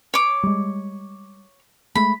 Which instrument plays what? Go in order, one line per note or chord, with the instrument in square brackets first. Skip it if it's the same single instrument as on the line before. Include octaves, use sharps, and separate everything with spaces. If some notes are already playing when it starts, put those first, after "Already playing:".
[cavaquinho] C#5 D6
[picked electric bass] G3 G#3
[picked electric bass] G#3 A3 [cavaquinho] B5